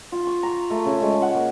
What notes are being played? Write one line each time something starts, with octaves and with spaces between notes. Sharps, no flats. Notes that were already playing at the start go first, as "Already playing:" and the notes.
F4
C#6
A#5
A3
C#3
G#3
F#5
A#3